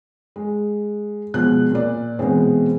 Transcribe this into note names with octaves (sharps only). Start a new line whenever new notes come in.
G#3
B2 F3 G#3 F#6
A#2 D5
B2 E3 G#3 B3 C4